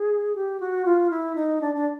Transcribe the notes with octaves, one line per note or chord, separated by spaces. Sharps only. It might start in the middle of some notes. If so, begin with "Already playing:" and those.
Already playing: G#4
G4
F#4
F4
E4
D#4
D4
D4